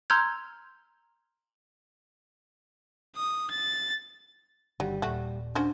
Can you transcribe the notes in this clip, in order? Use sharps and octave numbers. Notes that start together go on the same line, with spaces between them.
A#5 C6 E6 F6 G6 G#6
D#6
A6
G1 D3 D#3 F#3 G3
D#1 A#2 A3 F#4
C#4 D4 F#4 C5